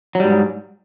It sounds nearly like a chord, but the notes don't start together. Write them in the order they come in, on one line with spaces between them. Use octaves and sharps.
F#3 G3 G#2